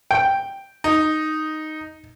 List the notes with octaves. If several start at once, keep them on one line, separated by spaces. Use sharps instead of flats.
G5
D#4